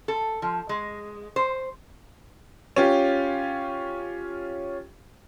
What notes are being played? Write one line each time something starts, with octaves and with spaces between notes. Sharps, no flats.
A4
F3
G#3
C5
C#4 F4 G4 F5